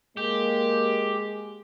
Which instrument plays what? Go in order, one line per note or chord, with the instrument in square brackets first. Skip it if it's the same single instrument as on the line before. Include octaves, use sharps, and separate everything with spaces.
[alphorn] G#3 [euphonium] A#3 [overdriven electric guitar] G4